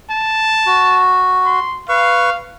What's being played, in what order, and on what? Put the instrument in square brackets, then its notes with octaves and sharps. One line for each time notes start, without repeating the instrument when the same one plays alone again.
[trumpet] A5
[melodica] F#4
[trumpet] C6
[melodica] B4 C#6 [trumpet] F5